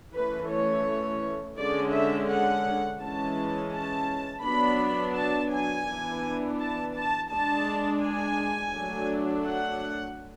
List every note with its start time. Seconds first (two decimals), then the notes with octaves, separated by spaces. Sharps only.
0.15 E3 A3 C#4 B4
0.50 C#5
1.58 D3 G#3 C#4 D5
1.94 E5
2.29 F#5
3.01 E3 G#3 C#4 A5
3.73 A5
4.44 F#3 B3 D4 B5
5.16 A5
5.51 G#5
5.87 E3 B3 D4
6.59 A5
6.94 A5
7.30 G#3 D4 A5
8.02 G#5
8.73 F#3 A3 D4
9.45 F#5